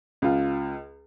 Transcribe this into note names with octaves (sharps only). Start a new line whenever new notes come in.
C#2 F4